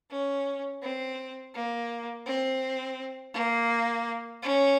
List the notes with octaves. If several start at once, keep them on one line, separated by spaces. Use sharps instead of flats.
C#4
C4
A#3
C4
A#3
C#4